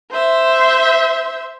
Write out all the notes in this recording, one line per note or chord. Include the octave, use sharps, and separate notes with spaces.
C5 E5